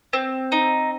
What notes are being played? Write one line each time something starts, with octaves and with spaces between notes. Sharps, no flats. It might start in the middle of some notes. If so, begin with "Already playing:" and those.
C4
D#4